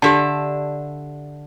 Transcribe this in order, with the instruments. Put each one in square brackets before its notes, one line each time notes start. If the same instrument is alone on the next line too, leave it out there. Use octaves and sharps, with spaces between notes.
[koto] D3 E5 [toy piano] G4 D5 A5